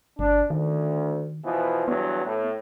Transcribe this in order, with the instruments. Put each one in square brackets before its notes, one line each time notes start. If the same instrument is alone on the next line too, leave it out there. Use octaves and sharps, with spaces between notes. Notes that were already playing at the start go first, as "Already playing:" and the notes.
[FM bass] G1 [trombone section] D4
[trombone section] D2 [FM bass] D#3
[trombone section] B2 E3 F3
[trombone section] E2 G2 F#3 [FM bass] B3
[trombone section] A2